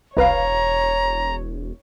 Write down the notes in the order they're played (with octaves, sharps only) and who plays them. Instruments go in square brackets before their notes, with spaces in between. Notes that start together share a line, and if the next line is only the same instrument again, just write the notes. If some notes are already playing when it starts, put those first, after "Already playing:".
[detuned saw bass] E1 [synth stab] C2 B4 F5 [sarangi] C#5 [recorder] A#5